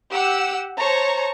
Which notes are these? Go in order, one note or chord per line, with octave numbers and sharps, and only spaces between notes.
G4 F#5 E6
C5 C#5 A5 A#5 C#6